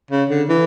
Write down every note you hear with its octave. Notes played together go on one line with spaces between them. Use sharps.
C#3
D3
E3